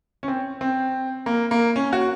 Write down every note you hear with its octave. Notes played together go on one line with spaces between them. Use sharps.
C#4
C4
C4
A#3
A#3
C#4
F#4